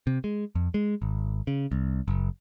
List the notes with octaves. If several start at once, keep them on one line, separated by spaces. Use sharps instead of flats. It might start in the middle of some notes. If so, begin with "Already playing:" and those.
C3
G#3
F2
G#3
G#1
C#3
C2
F#1